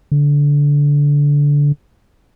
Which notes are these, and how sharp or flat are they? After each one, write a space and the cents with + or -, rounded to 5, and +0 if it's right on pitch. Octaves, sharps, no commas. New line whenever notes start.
D3 -20